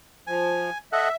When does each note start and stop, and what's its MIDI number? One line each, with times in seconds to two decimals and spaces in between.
0.27 0.70 53
0.27 0.78 80
0.93 1.09 69
0.93 1.09 75
0.93 1.16 76
0.93 1.09 78